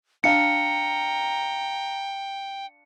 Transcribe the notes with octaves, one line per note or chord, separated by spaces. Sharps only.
D4 F5 G5 A#5 C#7